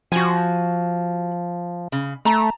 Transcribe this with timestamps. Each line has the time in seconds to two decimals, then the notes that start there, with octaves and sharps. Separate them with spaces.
0.12 F3 F#4 G#5
1.92 C#3
2.25 A3 A5 A#5